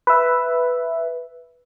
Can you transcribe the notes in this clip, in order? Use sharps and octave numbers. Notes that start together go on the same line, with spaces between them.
B4 E5